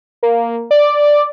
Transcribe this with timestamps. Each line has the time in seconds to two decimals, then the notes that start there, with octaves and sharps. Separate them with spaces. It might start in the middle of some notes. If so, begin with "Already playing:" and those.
0.23 A#3
0.71 D5